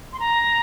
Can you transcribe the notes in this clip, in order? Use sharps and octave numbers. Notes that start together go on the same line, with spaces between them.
C6
A#5